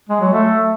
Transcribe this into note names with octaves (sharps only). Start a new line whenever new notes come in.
G#3
F#3
A3